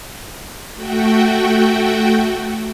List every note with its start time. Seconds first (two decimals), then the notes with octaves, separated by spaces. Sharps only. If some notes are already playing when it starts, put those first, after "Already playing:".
0.75 A3 F#4 G5